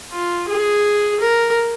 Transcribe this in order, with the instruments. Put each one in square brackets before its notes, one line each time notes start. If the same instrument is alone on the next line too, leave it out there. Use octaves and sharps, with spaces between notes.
[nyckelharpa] F4
G#4
A#4